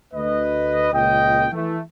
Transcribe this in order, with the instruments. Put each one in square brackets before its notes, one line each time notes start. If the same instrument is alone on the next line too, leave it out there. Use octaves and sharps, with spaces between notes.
[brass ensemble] D2 B4 D#5
C#2 A#2 D#5 G5
E3 A3